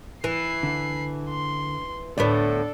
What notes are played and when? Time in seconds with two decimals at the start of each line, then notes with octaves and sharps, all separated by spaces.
0.24 E3 B5 C7
0.63 D3
1.29 C6
2.18 D2 A2 B3 D4 A4 D5